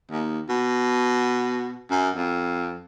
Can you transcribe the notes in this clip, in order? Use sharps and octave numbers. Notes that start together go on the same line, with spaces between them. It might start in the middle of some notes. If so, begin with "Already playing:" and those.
D#2
B2
F#2
F2